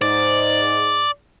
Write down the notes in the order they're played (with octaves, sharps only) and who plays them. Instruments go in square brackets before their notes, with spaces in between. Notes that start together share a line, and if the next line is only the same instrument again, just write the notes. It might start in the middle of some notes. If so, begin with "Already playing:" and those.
[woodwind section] G#2 [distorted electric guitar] D5